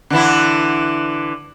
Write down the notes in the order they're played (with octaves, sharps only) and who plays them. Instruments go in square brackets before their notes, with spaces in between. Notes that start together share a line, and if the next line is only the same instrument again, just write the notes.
[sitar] D3 E3 E4